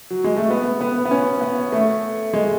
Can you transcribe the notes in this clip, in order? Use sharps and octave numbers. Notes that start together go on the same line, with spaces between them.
F#3
G#3
A3
B3
B3
B3
C#4
B3
A3
G#3